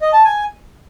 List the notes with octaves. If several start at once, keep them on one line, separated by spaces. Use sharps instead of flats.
D#5
A5
G#5